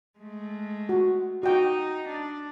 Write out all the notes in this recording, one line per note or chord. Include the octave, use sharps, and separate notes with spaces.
G#3 A3
F#4
D#4 F#4 G5
D4